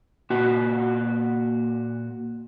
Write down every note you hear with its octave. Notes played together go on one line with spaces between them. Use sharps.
A#2 F#4